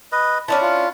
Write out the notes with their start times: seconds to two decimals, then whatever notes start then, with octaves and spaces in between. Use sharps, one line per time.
0.12 B4 D#5
0.48 C#4 D4 E4 A5
0.62 F4